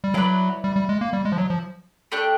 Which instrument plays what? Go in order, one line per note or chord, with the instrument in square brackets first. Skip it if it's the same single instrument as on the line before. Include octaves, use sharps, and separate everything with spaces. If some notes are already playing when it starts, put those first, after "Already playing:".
[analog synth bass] G3
[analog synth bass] F#3 [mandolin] E4 G#4 B4 D5
[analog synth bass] G3
G3
G#3
A#3
G3
G#3
F3
F#3
F3
[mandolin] A3 D4 G4